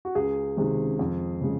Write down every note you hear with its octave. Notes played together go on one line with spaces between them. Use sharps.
F#4
C#2 G#4
C3 D#3 G#3
F2
C#3 G#3